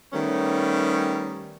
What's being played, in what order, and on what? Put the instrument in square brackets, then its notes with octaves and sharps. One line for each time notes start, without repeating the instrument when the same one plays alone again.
[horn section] D#3 G3 A3 B3 C#4